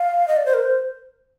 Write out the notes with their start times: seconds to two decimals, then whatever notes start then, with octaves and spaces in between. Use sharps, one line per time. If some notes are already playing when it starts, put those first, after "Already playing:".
Already playing: F5
0.28 D#5
0.37 D5
0.46 C5
0.54 A#4
0.63 C5